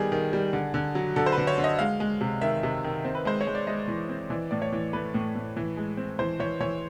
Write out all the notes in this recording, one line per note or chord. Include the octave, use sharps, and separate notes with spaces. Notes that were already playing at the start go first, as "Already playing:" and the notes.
Already playing: D#3 G3 B3 G4 G#4
D#3
G3
D3
D3
F#3
D3 A4
C5
B4
D3
C#5
D3
D#5
G#3 F5
G#3
C3
D#3 E5
C3
D#3
C4
B4
G#3 C5
C#5
G#3
D5
G#3 D#5
E3
C4
E3 D5
A2 D5
C#5
E3
A3 B4
A2
A2
E3
G#3
C4
E3 C5
E3 C#5
E3 C#5